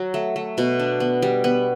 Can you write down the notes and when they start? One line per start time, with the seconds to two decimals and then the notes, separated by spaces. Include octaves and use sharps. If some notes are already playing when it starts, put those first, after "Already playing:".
Already playing: F#3
0.14 A3
0.36 A3
0.58 B2
0.80 D4
1.00 B3
1.22 G3
1.44 B3